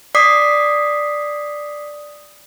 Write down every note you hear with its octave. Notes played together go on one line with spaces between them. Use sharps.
D5 D6 D#6 B6 C7